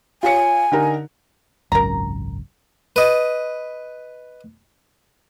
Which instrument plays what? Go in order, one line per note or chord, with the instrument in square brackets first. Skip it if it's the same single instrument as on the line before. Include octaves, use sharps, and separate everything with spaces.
[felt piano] F4 C#5 C#7 [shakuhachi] G#5
[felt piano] D3 D#4 A#4
[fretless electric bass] G#1 C#2 F#2 [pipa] A#4 A#5
[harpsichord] B4 D#5